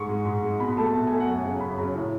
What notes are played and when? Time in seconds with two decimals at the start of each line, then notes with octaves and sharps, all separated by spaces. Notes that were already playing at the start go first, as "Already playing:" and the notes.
Already playing: G#2 C#6
0.09 G#3
0.25 G#2
0.43 G#3
0.60 B2 B5
0.77 A3 A5
0.94 B2 A5
1.07 A3 G#5
1.20 F#5
1.28 F#2
1.33 G#5
1.44 C#3 F#3
1.60 F#2 B5
1.78 C#3 F#3
1.95 A2